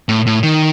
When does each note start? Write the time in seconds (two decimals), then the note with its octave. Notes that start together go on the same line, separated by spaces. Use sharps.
0.09 A2
0.26 A2
0.43 D#3